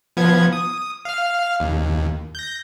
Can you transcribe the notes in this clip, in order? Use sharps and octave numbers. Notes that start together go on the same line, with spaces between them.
F3 B3 G#6
D#6
F5 F6
D#2
G6 A#6